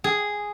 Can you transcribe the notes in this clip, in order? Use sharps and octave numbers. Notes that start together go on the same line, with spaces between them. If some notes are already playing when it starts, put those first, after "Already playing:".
G#4